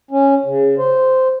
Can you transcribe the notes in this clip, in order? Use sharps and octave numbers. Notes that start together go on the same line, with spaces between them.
C#4
C#3
C5